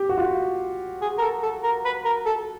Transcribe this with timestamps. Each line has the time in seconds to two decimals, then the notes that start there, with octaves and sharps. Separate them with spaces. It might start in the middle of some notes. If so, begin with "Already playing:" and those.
Already playing: G4
0.09 F#4
0.18 F4
1.02 G#4
1.18 A#4
1.22 A4
1.43 A4
1.63 A#4
1.85 B4
2.05 A#4
2.26 A4